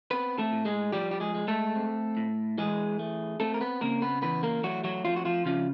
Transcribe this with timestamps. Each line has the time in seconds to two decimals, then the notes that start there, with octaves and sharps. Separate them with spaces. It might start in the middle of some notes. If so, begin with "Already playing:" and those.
0.11 B3 C4 B4
0.38 A3 A4
0.52 A2
0.65 G#3 G#4
0.92 F3 G3 G4
1.11 G4
1.20 G#3 G#4
1.35 G#3
1.48 A3 A4
1.76 C4
2.17 A2
2.58 E3 G#3 G#4
2.99 A3
3.40 A3 C4 A4
3.54 A#4
3.61 B3 B4
3.81 C#3 A#3 A#4
4.02 B3 B4
4.22 E3 B3 B4
4.43 A#3 A#4
4.63 F#3 A3 F#4
4.84 F#3 F#4
5.05 F3 C4 F4
5.17 F#4
5.25 F3 F4
5.45 C#3 F3 F4